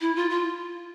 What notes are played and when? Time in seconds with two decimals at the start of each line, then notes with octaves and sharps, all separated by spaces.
0.01 E4
0.16 F4
0.30 F4